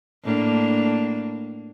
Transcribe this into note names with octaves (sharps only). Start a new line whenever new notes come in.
A2 A#3 D4